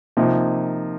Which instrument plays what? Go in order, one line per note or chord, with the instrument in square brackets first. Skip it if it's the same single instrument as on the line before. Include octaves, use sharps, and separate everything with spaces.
[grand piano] C3 F3 A#3 D#4